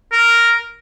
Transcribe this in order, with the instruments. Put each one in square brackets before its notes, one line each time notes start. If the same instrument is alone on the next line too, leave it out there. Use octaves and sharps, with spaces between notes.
[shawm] A#4